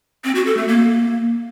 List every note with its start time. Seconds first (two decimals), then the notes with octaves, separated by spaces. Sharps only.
0.24 C4
0.35 F#4
0.46 A4
0.57 A3
0.68 A#3